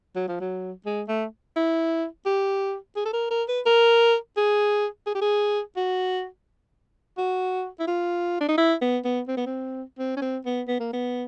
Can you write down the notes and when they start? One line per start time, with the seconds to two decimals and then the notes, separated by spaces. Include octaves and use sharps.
0.16 F#3
0.28 F3
0.41 F#3
0.86 G#3
1.08 A3
1.56 E4
2.26 G4
2.96 G#4
3.06 A4
3.13 A#4
3.31 A#4
3.48 B4
3.66 A#4
4.37 G#4
5.07 G#4
5.15 G4
5.21 G#4
5.77 F#4
7.18 F#4
7.80 E4
7.88 F4
8.41 D4
8.49 D#4
8.58 E4
8.82 B3
9.05 B3
9.28 C4
9.37 B3
9.46 C4
9.99 C4
10.17 C#4
10.21 C4
10.46 B3
10.68 B3
10.80 A#3
10.93 B3